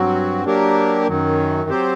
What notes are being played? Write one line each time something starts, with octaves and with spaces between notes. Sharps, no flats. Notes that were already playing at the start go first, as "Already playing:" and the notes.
Already playing: G2 F#3 C4 F#4
F#3 A#3 D4 G4 A#4
F#2 D#3 F#3
F#3 C4 G4 C5